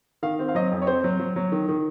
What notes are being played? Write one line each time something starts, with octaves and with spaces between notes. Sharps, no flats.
D#3 F5
C4
F5
F#3 D#5
F2
C#5
C4 C5
F#3
F#3
F#3
D#3
D#3